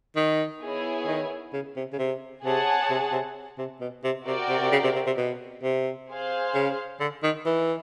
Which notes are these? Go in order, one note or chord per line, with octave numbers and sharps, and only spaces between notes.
D#3
B3 E4 G#4 C#5
D#3
C#3
C3
C#3
C3
C3 G#4 C#5 F#5 A5
C3
C3
C3
B2
C3
C3 F#4 A#4 D5 G5
C3
C3
C#3
C3
C3
C3
B2
C3
G#4 C5 F5
C#3
D3
D#3
E3